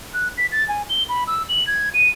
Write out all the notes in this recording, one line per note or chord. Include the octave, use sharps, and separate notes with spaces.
F#6
B6
A6
G#5
G7
B5
E6
F#7
G#6
D#7